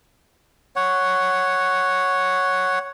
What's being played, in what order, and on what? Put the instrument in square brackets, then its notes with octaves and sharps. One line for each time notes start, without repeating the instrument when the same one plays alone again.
[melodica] C#5 F#5